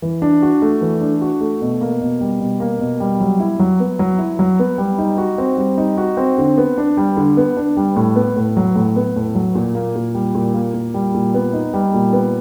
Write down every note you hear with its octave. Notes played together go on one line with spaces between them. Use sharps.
E3
D4
F#4
A3
E3
D4
F#4
A3
B2
A#3
B2
G3
B2
A#3
B2
G3
F#3
E4
F#3
B3
F#3
E4
F#3
B3
G3
D#4
F#4
C4
G3
D#4
F#4
C4
D3
B3
D4
G3
D3
B3
D4
G3
A2
B3
A2
F#3
A2
B3
A2
F#3
A#2
A#3
A#2
G3
A#2
A#3
A#2
G3
A#2
B3
D#4
G3
A#2
B3